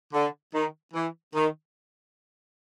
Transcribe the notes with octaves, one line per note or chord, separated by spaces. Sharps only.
D3
D#3
E3
D#3